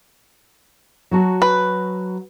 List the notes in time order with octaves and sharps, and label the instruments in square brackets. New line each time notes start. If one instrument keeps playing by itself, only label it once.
[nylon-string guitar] F#3 F#4 A5
[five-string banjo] B4